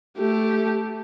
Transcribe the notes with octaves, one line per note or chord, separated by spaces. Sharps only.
A3 G4